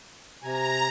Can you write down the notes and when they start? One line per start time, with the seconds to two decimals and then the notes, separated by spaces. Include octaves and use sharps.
0.43 C3 G#5 A#5